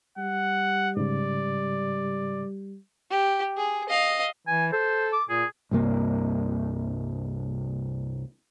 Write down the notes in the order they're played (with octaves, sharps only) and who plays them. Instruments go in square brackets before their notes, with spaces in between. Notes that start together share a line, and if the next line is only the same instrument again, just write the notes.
[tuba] G3 [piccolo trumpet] F#5
[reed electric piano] G#2 C#3 [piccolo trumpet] D5
[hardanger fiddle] G4
G#4
D#5 F5
[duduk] E3 [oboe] G#5
[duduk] A4 [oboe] C5
[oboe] D6
[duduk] A#2 [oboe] G#4
[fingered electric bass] C2 G2 C3 A#3